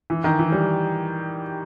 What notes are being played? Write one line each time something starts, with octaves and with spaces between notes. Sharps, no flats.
E3
D#3
E3
G3